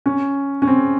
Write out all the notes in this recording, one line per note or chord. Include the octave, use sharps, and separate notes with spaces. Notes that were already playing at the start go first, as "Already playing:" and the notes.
C#4
C#4
C4